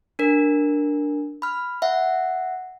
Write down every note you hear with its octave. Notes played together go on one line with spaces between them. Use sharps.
D4 A#4
B5 F6
E5 F#5